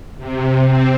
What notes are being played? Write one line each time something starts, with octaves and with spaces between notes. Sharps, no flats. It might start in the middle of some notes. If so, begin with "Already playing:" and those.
C3
C4